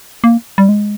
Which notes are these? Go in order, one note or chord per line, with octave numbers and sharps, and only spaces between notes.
A#3
G3
G#3